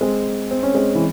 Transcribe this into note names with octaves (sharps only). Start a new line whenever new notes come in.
G#3 C4
C4
C#4
G#3 C4
E3